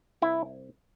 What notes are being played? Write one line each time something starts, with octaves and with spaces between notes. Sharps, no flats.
C2 E4